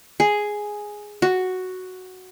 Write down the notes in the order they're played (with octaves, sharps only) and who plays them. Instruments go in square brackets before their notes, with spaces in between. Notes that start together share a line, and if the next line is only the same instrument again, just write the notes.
[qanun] G#4
F#4